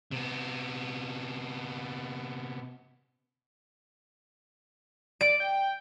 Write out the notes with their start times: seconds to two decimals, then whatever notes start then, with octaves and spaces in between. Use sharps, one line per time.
0.11 C3 B3
5.21 D5 D7
5.40 G5